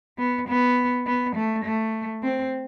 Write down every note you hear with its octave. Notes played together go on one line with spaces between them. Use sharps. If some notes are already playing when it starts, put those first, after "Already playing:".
B3
B3
B3
A3
A3
C4